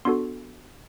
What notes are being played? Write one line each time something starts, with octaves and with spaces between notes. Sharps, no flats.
B3 D4 F#4 A4 C6